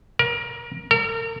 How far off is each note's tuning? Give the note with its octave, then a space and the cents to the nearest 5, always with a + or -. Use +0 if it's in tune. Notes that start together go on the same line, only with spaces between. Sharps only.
A#4 +25
A#4 -40